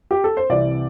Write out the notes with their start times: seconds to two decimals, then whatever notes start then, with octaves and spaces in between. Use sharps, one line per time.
0.11 G4
0.24 A4
0.37 C5
0.49 C2 C3 E3 D5